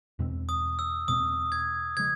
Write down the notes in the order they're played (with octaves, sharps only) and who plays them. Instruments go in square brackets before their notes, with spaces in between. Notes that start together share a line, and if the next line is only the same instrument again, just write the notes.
[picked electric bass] E2 B2 G#3 C4
[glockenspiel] D#6
E6
[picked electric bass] E2 B2 G#3 C4 [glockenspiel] D#6
[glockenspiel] G#6
[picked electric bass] C#3 F3 G#3 [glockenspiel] G#6